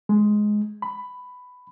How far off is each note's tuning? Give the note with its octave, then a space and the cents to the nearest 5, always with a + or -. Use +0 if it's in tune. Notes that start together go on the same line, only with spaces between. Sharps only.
G#3 +10
B5 +10